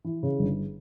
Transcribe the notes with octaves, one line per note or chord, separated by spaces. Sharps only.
E3
C#3
G1